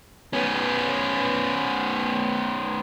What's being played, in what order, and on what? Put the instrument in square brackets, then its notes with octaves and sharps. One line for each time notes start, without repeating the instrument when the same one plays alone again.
[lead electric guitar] B3 C#4